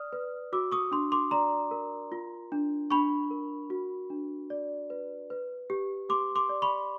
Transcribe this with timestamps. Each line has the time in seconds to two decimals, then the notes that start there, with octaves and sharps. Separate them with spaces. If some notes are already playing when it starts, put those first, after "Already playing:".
Already playing: D5 D#6 F6
0.13 B4
0.53 F#4 D6 E6
0.72 C#6 D#6
0.91 D4 C6 D6
1.12 C6 D6
1.31 D5 A#5 C6
1.71 A#4
2.12 F4
2.52 D4
2.90 D4 B5 C#6
3.31 A#4
3.70 F#4
4.10 D4
4.50 D5
4.90 B4
5.30 B4
5.70 G4
6.09 G4 C6 D6
6.36 C6 D6
6.49 D5
6.62 B5 C#6